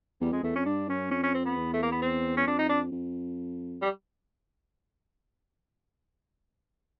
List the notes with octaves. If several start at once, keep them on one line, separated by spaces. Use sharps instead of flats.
E2 G3
F2 G#3
E2 A3
F2 C#4
G2 D4
F#2 C#4
F2 C#4
C#4
C4
B3
E2
A3
A#3
B3
C4
C#4
F2 D4
D#4
D4
F2
G3